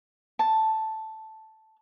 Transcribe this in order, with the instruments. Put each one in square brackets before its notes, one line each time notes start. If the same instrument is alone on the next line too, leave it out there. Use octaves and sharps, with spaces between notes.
[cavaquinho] A5